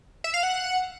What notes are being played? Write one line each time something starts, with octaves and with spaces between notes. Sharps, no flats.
E5
F5
F#5